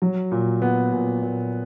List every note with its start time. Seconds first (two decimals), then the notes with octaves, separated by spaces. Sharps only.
0.02 F#3
0.32 A#2
0.62 B3
0.92 A#2
1.22 A#2